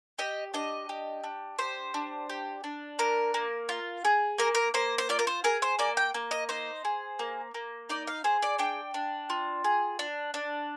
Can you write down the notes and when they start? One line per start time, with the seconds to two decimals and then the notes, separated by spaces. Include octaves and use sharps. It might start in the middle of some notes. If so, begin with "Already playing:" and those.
0.19 G4 D#5
0.54 D4 D#5
0.89 G4
1.24 D4
1.59 G4 C5
1.94 D4
2.29 G4
2.64 D4
2.99 A#3 A#4
3.34 A#3
3.69 F4
4.05 G#4
4.38 A#3 A#4
4.55 A#4
4.74 A#3 C5
4.98 C5
5.09 F4 D5
5.19 A#4
5.27 C5
5.44 G#4 A#4
5.62 C5
5.79 A#3 D5
5.97 G5
6.14 A#3
6.31 D#5
6.49 D#4 C5
6.85 G#4
7.19 A#3
7.54 A#3
7.90 D#4 D5
8.07 F5
8.24 G#4 C5
8.42 D5
8.59 D4 G5
8.94 D4
9.30 F4
9.64 G#4
9.99 D4
10.34 D4